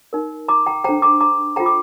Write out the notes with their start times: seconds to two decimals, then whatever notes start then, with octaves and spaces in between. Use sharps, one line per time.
0.13 D#4 A#4
0.48 A#5 D6
0.66 G5 A#5
0.84 D4 A4 C5 G5 A#5
1.02 A#5 D6
1.20 A#5 D6
1.56 F4 A4 C5 G5 A#5
1.66 D6